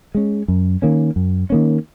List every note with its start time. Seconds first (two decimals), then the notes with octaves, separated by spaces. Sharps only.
0.15 G#3 C#4
0.48 F#2
0.82 D#3 A#3 C#4
1.16 F#2
1.50 D#3 A#3 C#4